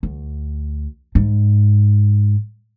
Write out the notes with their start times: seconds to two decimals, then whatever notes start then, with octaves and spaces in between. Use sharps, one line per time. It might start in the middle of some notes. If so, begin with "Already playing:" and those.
0.03 D2
1.15 G#2